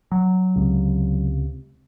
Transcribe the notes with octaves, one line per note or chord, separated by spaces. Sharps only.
F#3
C#2 C3